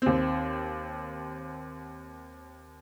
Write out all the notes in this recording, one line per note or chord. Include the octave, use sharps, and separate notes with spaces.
D#2 C4